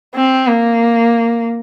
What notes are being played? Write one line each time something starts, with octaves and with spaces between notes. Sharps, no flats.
C4
A#3